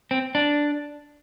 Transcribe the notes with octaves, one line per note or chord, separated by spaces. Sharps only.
C4
D4